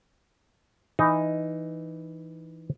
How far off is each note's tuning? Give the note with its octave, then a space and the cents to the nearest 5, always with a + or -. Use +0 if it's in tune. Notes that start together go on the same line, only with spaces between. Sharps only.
E3 +0 D#4 +0